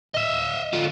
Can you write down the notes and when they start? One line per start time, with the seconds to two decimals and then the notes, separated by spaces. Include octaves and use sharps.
0.14 D#5 E5
0.73 D3 F4